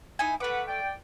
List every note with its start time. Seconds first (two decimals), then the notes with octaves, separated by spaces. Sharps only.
0.19 D#4 E4 G#5
0.40 A3 B4 F#5 D6
0.67 D5 G5